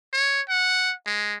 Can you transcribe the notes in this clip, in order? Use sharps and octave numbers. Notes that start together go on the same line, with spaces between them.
C#5
F#5
G#3